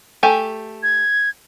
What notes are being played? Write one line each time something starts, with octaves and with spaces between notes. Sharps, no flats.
A3 G4 G#5
G#6